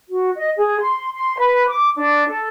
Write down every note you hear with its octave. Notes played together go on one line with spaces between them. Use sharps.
F#4
D#5
G#4
C6
C6
B4
D6
D4
A4